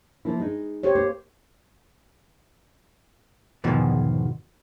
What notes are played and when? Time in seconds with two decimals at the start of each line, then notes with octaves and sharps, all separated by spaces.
0.25 F3 A#3 E4
0.40 G#3 D#4
0.83 G4 C5 C#5
0.95 A#3 C5
3.64 E2 G#2 B2 D#3 F3